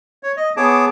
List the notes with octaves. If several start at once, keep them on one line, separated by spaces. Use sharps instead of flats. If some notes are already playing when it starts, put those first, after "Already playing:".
C#5
D#5
B3 G#4 C#5 A5 D6